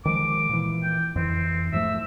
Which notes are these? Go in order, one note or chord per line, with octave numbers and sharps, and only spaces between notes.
D#3 F3 G#3 D6
A#2 E3
G5
F2 E3 C4
G#2 F3 A3 E5